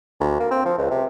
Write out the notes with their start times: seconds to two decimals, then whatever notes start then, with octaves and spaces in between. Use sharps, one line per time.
0.20 D2
0.40 A#3
0.51 C4
0.65 F3
0.78 C#2
0.90 C3